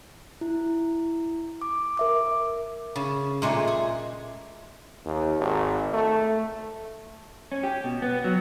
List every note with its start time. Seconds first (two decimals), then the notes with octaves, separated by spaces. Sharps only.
0.41 E4
1.62 D6
1.97 A#4 E5 D6
2.96 C#3
3.42 A#2 G#3 A3 D5
3.67 G#4
5.06 D#2
5.39 G#1
5.93 A3
7.52 C#4
7.63 G4
7.84 B2
8.02 B3
8.24 F#3